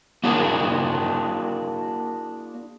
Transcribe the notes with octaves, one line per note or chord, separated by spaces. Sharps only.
A#3 D4 E4 F#4 G#4 A#4